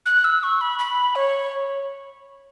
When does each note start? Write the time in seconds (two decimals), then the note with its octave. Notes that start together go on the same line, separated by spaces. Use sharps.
0.06 F#6
0.24 E6
0.43 C#6
0.61 B5
0.79 B5
1.15 C#5